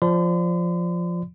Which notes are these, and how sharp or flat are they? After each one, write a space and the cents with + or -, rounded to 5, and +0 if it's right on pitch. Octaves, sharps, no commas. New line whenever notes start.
F3 +0 D5 -5 C6 -45